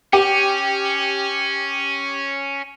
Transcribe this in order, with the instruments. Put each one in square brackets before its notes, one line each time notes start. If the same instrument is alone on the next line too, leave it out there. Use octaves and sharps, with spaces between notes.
[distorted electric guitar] C#4 [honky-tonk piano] G4